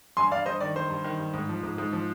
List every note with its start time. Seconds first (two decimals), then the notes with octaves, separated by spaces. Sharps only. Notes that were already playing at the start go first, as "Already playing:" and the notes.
0.17 G2 G#5 C6
0.31 G2 D5 F5
0.46 G2 C5 D#5
0.60 D#3 D5
0.76 G2 C5
0.91 G2
1.04 D#3
1.19 G2
1.34 G#2
1.49 F3
1.63 G#2
1.78 G#2
1.93 F3